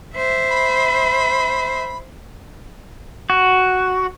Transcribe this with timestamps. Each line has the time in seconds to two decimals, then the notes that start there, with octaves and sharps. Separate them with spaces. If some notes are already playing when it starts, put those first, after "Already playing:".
0.16 C5 E5
0.50 B5
3.30 F#4